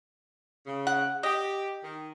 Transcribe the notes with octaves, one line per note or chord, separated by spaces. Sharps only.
C#3
F#5
G4 D#5
D#3